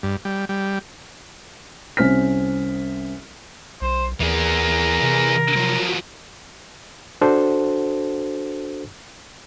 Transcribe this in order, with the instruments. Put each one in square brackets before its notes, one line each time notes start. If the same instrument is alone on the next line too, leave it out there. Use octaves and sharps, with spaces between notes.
[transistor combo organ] G2
G3
G3
[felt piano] C2 C#4 C5 F6 B6
[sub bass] B1 [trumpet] C5
[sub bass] D#2 [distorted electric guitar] E3 G#4 [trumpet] A#4
[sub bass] C3
[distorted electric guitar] F3 F#3
[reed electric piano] D4 F#4 A4 C5